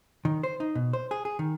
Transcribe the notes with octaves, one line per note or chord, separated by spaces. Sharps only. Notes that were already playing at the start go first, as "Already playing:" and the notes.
D#3
C5
D#4
B2
C5
G#4
G#4
D#3